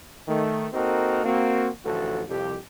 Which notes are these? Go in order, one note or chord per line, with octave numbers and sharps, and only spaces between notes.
D#3 A3
A#3 C4 D#4 F#4 A4 A#4
A#3 C4 F#4
A1 D2 F3 F#4 A4
C2 F2 G4